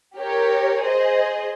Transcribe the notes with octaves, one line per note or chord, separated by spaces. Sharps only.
G4 A#4 C#5
G#4 C5 D#5